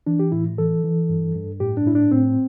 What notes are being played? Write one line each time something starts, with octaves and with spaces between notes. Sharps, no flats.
E3 D4
G4
A2 E4
E3 A4
E3
G2
G2
A2 G4
D4
A2 E4
D4
A2 C4